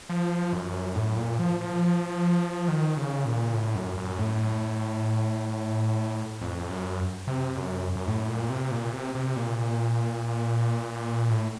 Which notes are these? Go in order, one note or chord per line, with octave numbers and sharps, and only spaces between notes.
F3
F#2
A2
A#2
F3
F3
D#3
C#3
A#2
A2
F#2
F#2
A2
F2
F#2
C3
F#2
F#2
A2
A#2
C3
A#2
C3
C3
A#2
A2